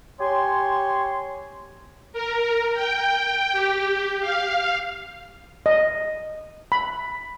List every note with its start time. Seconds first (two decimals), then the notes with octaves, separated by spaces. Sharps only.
0.20 G4 C#5 G#5 C6
2.13 A#4
2.74 G5
3.52 G4
4.21 F5
5.66 D#5
6.72 B5